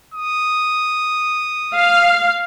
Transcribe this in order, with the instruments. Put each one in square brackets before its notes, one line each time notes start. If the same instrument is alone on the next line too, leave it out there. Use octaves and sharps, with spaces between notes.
[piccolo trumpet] D#6
[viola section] F5